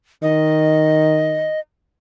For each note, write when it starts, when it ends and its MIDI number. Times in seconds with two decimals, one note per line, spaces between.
0.22 1.52 51
0.22 1.60 75